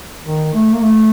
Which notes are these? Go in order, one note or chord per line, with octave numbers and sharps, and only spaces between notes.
D#3
A3
A#3
A3